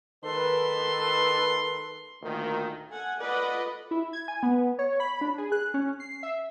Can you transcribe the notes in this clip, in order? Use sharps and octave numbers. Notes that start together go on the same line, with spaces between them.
D#3 A4 B4 C6
D2 A#2 D#3
A4 F#5 G#5
F4 A4 B4 D5 D#5 F#5
E4
G#6
G#5
B3
C#5
B5
D4
G#4
F#6
C#4
C7
E5